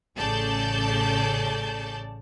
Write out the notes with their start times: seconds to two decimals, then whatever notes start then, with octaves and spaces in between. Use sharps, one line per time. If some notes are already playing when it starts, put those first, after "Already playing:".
0.17 A1 C#3 A4 D5 A5 G6